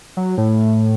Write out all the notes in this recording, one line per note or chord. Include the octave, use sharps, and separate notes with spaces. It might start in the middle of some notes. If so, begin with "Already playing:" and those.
F#3
A2